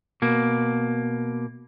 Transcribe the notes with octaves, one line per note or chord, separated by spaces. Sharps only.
B2 A#3